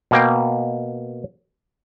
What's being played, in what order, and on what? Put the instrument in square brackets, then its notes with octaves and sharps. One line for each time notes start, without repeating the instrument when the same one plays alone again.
[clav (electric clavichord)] B2 A#3 G5